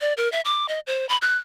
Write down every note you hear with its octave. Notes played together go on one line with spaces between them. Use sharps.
D5
A#4
E5
D6
D#5
C5
B5
F#6